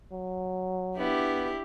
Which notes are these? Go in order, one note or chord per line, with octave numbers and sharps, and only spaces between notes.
F#3
B3 D4 E4 G4